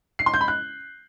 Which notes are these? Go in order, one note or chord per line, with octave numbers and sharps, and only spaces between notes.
C7
C6
G6
B5
F#6